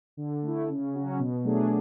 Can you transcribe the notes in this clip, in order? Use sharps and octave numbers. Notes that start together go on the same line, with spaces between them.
D3
A3 E4
C#3
F#3 C#4 F#4
B2
F#3 A3 D4 G#4